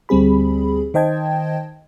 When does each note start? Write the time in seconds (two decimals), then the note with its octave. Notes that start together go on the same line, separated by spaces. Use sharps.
0.09 D2 G3 C4 G#4 B5
0.94 D#3 C5 D#5 G5 A5 G#6